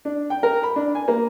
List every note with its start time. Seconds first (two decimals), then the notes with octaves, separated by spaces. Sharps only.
0.05 D4
0.30 G5
0.43 A#4
0.63 B5
0.76 D4
0.95 G#5
1.08 A#3